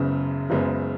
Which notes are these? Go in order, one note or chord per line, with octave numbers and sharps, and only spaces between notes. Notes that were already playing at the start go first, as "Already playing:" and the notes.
Already playing: F#1 F#2 C#3 G#3 B3
F#1 F#2 C#3 G#3 B3